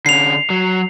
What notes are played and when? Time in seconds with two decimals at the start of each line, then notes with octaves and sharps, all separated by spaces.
0.06 D3 C#4 C7 F7
0.50 F#3